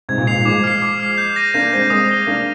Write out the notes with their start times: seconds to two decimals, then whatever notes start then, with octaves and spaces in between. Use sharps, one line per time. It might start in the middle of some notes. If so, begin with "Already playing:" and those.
0.09 G#2 C3 G#6
0.18 A#2
0.27 G#2 C7 F7
0.36 A#2
0.45 F3 G#3 D6
0.63 F6 C7
0.82 D6
1.00 F6 C7
1.18 G6
1.36 A#6 D#7
1.54 A#3 D4 G6
1.73 G#3 C4 A#6 D#7
1.90 G#3 C4 D#6
2.09 A#6 D#7 G7
2.27 A#3 D4 D#6